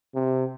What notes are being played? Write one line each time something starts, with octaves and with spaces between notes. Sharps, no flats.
C3